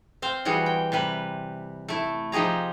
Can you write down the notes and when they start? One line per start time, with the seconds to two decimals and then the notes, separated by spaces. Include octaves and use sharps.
0.22 C4 C5 F5
0.45 E3 G3 F#4 G#4
0.66 G5
0.92 C3 G3 B4
1.89 A3 E4
2.32 F3 D#4 G4 G#4 A#5